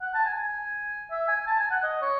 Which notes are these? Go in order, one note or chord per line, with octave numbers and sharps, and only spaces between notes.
F#5
A5
G#5
G#5
E5
G#5
A5
G#5
F#5
D#5
C#5